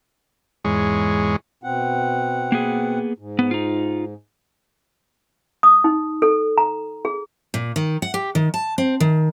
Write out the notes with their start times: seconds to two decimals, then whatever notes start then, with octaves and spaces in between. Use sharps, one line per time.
0.64 E2 G#2 G#3 C#5
1.64 B2 C4 F#5
2.52 A#3 B3 G#4
3.18 G#2
3.39 B3
3.51 D#4 F4
5.63 D#6
5.84 D#4
6.22 A4
6.58 A#5
7.05 G#4
7.54 A#2
7.76 D#3
8.02 F#5
8.14 G4
8.35 D#3
8.54 A5
8.78 C4
9.00 D#3